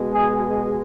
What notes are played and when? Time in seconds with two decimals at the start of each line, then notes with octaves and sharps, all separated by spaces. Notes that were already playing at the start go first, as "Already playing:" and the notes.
Already playing: B2 G#3
0.12 G#4